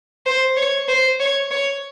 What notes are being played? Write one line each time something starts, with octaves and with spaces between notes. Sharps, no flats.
C5
C#5
C5
C#5
C#5